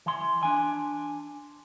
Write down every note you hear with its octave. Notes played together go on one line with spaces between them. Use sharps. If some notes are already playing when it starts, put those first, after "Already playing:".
E3 C6
D4 G#5